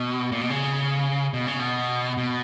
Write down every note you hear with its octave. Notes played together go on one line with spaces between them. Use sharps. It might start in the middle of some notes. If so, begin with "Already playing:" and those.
Already playing: B2
A#2
B2
C#3
B2
C#3
B2
B2